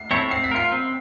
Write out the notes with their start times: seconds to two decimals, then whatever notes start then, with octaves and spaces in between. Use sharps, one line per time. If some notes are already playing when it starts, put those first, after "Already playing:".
Already playing: C7
0.11 C4 E4 A4 C#5 C#7
0.31 C4 C7
0.44 B6
0.51 F4 A#4 C7
0.72 C4